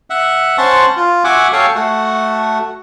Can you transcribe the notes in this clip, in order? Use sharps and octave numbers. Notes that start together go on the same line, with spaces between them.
E5 F#5
C#4 C5 F#5 A5 C6 C#6
F4
F#4 E5 F#5 G#5 D6
A4 C#5 F5 G5 G#5
A3 F#4